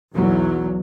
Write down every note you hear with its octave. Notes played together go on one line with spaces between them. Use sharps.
B1 E2 F#3